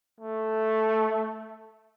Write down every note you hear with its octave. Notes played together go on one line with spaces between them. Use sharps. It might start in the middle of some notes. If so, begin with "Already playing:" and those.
A3